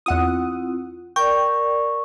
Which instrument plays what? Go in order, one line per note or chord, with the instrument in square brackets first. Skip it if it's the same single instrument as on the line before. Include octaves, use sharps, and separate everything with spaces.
[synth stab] E2 F#5 D#6 [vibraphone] C4 E4 F4
[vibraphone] A#4 D5 [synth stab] G5 [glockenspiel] C#6